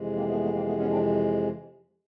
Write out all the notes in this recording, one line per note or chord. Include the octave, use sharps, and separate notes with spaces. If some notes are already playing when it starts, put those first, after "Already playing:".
Already playing: F2 C3 E3 G#3
A#3 C4
A3 B3
A3 B3
A#3 C4
A3 B3
B3 C#4
C4 D4